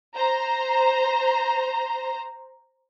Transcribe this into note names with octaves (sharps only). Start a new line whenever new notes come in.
C5 A#5